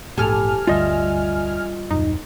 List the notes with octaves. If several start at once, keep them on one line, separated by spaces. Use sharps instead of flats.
A#1 E2 G#2 A3 G4 A4 G#5 F6
G1 D2 G3 F4 D#5 E5
D#1 F#2 D#4